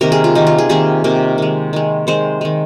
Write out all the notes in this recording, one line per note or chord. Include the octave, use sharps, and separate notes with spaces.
C3 D#3 A#3 A#4
G#4
F4
C3 D#3 A#3 D#4
F4
G#4
C3 D#3 A#3 G#4
C3 D#3 A#3
D#3 G#3
D#3 G#3
D#3 G#3 C5
D#3 G#3